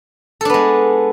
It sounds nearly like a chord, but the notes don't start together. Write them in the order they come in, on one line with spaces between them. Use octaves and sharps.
A4 D4 B3 G#3